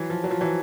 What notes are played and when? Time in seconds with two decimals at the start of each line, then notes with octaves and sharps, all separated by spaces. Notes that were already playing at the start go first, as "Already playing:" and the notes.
Already playing: E3 F#3
0.10 F3
0.24 F#3
0.31 F3
0.41 E3 F#3